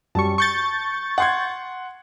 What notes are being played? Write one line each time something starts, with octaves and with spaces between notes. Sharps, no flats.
F#2 G3 A5 C#6
C#6 G6 A6
F#5 C6 G#6